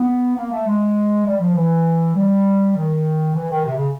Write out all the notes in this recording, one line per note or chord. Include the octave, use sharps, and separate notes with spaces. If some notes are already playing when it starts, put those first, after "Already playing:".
Already playing: B3
A#3
A3
G#3
G3
F3
E3
G3
D#3
E3
D#3
C3
C#3